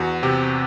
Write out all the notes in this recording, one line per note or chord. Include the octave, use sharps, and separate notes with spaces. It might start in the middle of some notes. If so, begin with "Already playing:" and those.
Already playing: E2 F#4
C3 G4